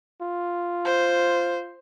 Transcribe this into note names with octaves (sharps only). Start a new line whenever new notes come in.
F4
C5